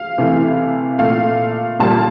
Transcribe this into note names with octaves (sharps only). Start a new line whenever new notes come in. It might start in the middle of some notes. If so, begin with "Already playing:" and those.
Already playing: F5
C3 E3 A3
A#2 A3 F5
A#2 G3 A#3 A5